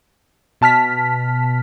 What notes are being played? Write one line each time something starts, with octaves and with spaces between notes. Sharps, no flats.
B2 A5 F6 B6